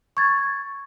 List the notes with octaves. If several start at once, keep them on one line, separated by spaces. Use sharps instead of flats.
C#6 G#6 A6